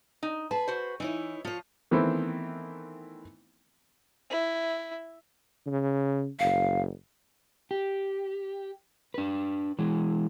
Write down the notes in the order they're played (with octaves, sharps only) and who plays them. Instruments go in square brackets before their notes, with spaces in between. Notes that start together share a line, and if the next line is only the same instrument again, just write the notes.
[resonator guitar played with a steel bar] D#4
[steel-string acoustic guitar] G#4 B4 [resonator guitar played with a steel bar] A5
[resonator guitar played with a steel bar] F#4 C5
[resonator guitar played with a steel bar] E3 [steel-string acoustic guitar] D#4 E4 C#5
[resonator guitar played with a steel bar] F3 [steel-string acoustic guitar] F4 C#5
[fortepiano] D#3 E3 A3 B3 C4 E4
[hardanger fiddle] E4
[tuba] C#3
[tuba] F#1 [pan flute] F5
[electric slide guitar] G4
D4 B4
E3 G#3